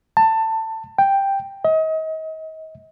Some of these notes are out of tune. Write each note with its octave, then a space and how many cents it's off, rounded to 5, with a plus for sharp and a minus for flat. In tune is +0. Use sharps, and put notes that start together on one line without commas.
A5 +20
G5 +5
D#5 +35